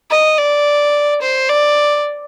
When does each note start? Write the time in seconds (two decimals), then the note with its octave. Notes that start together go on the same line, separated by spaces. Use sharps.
0.10 D#5
0.38 D5
1.22 C5
1.49 D5